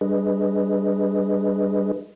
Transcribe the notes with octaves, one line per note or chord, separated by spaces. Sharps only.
G3 D4 G#4 B4 D#5